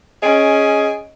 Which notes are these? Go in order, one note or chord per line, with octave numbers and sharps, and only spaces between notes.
C#4 G#4 D#5 D7